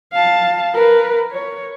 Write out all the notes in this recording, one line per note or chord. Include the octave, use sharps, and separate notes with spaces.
F5 A5
A#4 B4
C#5